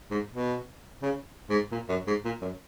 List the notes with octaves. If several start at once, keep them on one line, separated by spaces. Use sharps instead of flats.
G#2
B2
C#3
G#2
A#2
F#2
G#2
A#2
F#2